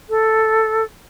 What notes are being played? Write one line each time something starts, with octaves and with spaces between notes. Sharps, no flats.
A4